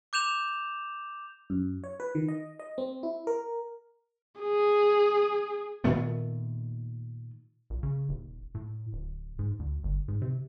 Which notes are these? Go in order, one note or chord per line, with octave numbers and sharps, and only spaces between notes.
D6 G6 E7 F7
F#2
C#5
B4
D#3
D#5
D#5
C4
E4
A#4
G#4
A#2 D#3 A3 B3
A#1
C#3
D#1
A2
D1
G#2
D2
G1
G#2
C3